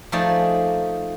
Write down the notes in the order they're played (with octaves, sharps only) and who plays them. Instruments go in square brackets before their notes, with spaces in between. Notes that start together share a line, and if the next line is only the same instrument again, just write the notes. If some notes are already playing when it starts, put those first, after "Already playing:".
[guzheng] F3 A3 D#4 G#4 D5